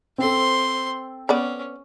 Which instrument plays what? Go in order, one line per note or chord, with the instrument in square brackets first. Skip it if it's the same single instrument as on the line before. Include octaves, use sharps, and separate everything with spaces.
[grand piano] C4 A4 [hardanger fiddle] C5 C6
[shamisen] B3 D5 B5 [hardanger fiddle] C#4